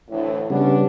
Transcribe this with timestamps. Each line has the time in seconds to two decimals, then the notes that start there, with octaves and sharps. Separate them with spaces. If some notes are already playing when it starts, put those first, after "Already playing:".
0.11 D2 A2 E3
0.50 C#3 G3 B3 C#4 D4